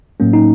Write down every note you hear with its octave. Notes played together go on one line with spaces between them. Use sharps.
A2 F#3 A#3 C#4
D#4